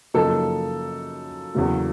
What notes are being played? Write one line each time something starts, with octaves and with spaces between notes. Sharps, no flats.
F#2 C#3 F3 A#3 D#4 A4
E2 C#3 F#3 A#3